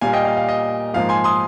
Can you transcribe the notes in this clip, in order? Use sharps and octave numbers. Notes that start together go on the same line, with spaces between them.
A#2 G3 A#3 F5 G#5
D#5 G5
F5
F5
D#5
G#2 F3 A#3 F5
G#5 C6
C6 D#6